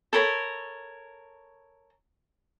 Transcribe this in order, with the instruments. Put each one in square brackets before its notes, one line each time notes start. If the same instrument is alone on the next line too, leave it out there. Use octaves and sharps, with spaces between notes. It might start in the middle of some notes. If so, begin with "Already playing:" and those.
[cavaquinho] A4 A#4 C#5 B5